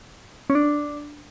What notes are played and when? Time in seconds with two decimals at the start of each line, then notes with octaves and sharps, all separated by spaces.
0.50 C#4
0.55 D4